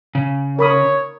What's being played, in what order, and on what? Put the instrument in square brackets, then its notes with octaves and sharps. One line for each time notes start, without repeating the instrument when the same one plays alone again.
[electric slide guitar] C#3
[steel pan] A#4 B5 D#6 [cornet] C#5